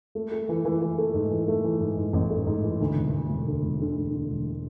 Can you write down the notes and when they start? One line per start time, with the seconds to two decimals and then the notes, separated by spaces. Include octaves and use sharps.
0.15 A3
0.32 A3
0.49 E3
0.65 E3
0.81 E3
0.98 A3
1.14 G#2
1.31 E3
1.48 A3
1.64 E3
1.80 G#2
1.97 G#2
2.13 A1
2.30 A3
2.46 G#2
2.63 E3
2.81 D2
2.97 E1
3.14 E1
3.30 E1
3.47 D2
3.63 E1
3.80 D3
3.96 D2
4.12 D3
4.30 E1